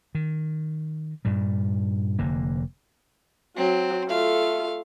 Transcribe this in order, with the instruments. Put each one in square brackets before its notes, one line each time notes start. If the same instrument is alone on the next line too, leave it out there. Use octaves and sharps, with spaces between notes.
[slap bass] D#3
G2 A#2 G3
F1 D3 A#3
[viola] F#3 [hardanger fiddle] C4
[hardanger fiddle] A3 F5 [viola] F4 A4